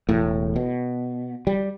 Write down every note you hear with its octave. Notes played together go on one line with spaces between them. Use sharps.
E1 A2
B2
G3